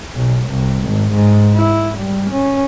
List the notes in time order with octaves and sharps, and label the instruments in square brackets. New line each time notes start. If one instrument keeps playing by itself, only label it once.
[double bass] B1
C2
G#1
G#2
E4
G3
C#4